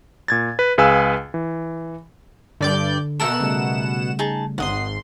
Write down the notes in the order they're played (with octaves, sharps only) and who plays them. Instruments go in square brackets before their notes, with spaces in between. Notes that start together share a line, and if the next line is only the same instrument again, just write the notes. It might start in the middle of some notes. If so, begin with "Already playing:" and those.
[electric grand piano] A#2 G#6 A6
B4
C#2 G#4 B4 F5 G#5 E6
E3
[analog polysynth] G2 D5 G6 [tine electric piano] D3
[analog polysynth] B2 F#5 E7 [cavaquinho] A4 A#4 E5
[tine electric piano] C#3 G3 A3
[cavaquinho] D#4 G#4 A5
[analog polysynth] G#1 C6 [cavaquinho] D#5 F#5